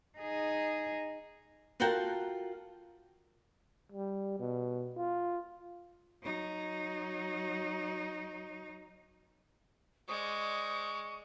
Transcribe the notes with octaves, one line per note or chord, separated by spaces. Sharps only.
D#4 G#4
F4 F#4 A4 A#4 F#5 G5
G3
B2
F4
F#3 D#4
G#3 C5 D5 C#6 D#6